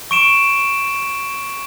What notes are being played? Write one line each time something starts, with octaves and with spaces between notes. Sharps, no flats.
C#6 D7 E7